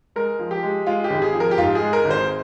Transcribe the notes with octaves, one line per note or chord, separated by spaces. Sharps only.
G#3 A#4
F3
G4
G#3
G#3 F4
G4
G#1
G#4
F3
A#4
G4
G#2 F4
G#4
G#3
A#4
G#1
C5